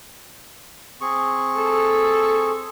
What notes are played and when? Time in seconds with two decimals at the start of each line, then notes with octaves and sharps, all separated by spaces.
1.01 C4 G#4 C#6
1.57 A4